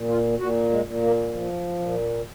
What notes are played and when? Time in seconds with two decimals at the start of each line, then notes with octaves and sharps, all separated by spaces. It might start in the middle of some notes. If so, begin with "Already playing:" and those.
Already playing: A#2
0.08 F4
0.39 A#2 F#4
0.71 G#3
0.86 A#2
1.02 A#3
1.33 F3
1.79 A#2